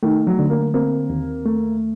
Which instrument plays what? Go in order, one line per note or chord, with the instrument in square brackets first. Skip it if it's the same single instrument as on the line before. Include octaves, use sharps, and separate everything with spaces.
[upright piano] D#3 [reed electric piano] A3
[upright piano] F#3
[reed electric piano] D3
[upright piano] A#3
[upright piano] A#3 [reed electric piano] C4
[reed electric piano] D#2
A3